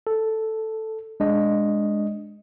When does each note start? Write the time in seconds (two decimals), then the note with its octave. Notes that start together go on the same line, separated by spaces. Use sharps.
0.07 A4
1.20 G#3 D4 D#5